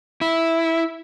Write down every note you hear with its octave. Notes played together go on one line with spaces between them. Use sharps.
E4